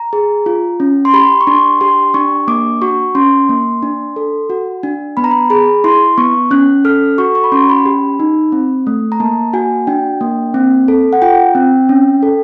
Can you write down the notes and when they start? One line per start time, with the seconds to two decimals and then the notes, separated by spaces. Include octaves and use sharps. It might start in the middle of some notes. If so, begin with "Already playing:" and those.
Already playing: A#5
0.13 G#4
0.46 F4
0.80 C#4
1.05 C6
1.13 G4 B5
1.41 C#6
1.47 D4 C6
1.81 G4 C6
2.14 D4 C#6
2.48 A#3 D6
2.82 F#4 C#6
3.15 C#4 C6
3.49 A#3
3.83 D4
4.16 A4
4.50 F#4
4.83 D4
5.17 B3 B5
5.24 A#5
5.31 B5
5.50 G#4 B5
5.84 E4 C6
6.18 B3 C#6
6.51 C#4 F#6
6.85 A4 F6
7.18 F#4 C#6
7.35 C#6
7.44 B5
7.52 C#4 C6
7.69 B5
7.86 G4
8.20 D#4
8.52 C4
8.87 A3
9.12 A#5
9.20 A#3 A5
9.53 F#4 G#5
9.87 D4 G5
10.21 A#3
10.54 C4
10.88 A4
11.13 F#5
11.22 F4 G5
11.55 C4
11.89 C#4
12.23 A4